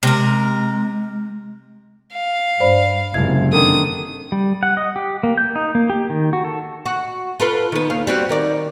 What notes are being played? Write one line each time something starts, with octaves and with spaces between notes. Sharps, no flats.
C3 G#3 A#4
F5
G2 C5 D5 B5
F#1 G#2 C3 E4 G#6
D3 D#3 D4 D#6
G3
F#5
D#5
G4
A#3
G6
D#4
A#3
G4
D#3
F#4
A4
F#4
F4 A4 B4
D#3 B3
D#2 F5
G3 C4 F#4
D#3 A#4 D5